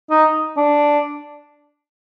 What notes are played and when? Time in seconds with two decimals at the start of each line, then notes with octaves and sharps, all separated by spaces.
0.10 D#4
0.57 D4